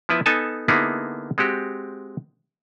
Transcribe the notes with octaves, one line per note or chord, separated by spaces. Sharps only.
F3 B3 E4 B4 E5
B3 D#4 A4 G#5 A5
D3 A#3 B3 D#4 E4 G#4
G#3 C4 F#4 G4